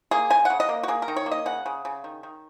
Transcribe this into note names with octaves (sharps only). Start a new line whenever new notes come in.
A#3 G#4
C#3 G#5
C#3 F#5
D#5
A#3
F#4
A#3 G#4
A#4
D#3
C#5
A#3
D#5
C#3 F#5
C#3
C#3
D#3
D#3